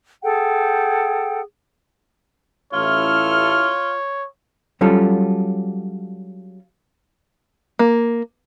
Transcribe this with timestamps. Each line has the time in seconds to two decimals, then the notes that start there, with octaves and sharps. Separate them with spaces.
0.23 G#4 A4 F#5 G5
2.73 A1 E4 F4 A4 C#5 F6
4.81 F#3 G3 C#4 F4 A4
7.79 A#3